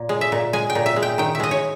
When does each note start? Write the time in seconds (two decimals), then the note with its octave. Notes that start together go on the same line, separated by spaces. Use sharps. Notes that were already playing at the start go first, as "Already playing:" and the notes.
Already playing: A#2
0.09 G#3
0.21 E5
0.32 A#2
0.53 G#3 G#5
0.70 G5
0.75 A#2
0.86 E5
0.96 G#3
1.02 G5
1.18 D#3 G5
1.35 E5
1.40 G#3 D#5
1.51 C#5